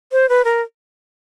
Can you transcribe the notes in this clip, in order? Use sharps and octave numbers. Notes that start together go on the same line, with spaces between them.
C5
B4
A#4